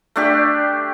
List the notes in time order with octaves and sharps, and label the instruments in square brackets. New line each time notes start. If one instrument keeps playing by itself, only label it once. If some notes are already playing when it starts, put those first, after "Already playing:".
[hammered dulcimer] A3 D4 G4